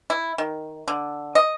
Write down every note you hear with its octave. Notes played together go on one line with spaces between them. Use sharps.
E4
D#3
D3
D#5